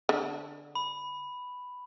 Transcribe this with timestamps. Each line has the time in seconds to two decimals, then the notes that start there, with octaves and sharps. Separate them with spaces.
0.09 D3
0.75 B5